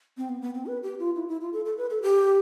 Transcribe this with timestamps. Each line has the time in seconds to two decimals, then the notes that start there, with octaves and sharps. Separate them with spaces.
0.17 C4
0.29 B3
0.42 B3
0.54 C4
0.66 B4
0.83 G4
0.99 F4
1.16 E4
1.28 E4
1.41 F4
1.53 A4
1.65 A4
1.78 B4
1.90 A4
2.02 G4